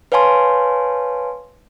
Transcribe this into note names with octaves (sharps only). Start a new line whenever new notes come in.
B4 C#5 F5 G#5 A5 C6